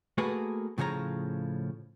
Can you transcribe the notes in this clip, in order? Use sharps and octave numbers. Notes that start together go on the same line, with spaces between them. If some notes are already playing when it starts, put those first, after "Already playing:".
A3 A#3 F#4 G#4 A#4 B4
A2 C#3 F3 C#5 A#5